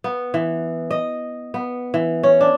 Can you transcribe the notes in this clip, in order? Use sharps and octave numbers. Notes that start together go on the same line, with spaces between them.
B3
E3
D#5
B3
E3
C#4
D4